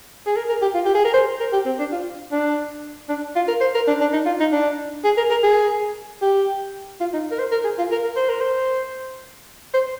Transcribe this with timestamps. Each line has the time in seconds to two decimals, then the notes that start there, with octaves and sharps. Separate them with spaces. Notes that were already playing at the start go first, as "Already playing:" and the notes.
0.27 G#4
0.36 A#4
0.49 A#4
0.62 G4
0.74 F4
0.85 G4
0.95 G#4
1.05 A#4
1.14 C5
1.40 A#4
1.53 G4
1.65 C4
1.79 D4
1.92 F4
2.32 D4
3.09 D4
3.36 F4
3.48 A#4
3.61 C5
3.75 A#4
3.88 D4
4.01 D4
4.13 D#4
4.26 F4
4.40 D#4
4.52 D4
5.04 G#4
5.17 A#4
5.31 A#4
5.43 G#4
6.22 G4
7.00 F4
7.13 D#4
7.31 A#4
7.39 C5
7.51 A#4
7.64 G#4
7.78 F4
7.92 A#4
8.04 A#4
8.16 C5
8.30 A#4
8.41 C5
9.74 C5